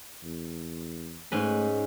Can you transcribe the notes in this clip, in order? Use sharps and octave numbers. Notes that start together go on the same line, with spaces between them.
E2
G#2 A3 C#4 B4